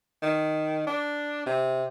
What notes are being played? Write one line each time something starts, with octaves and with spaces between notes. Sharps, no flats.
D#3
D4
C3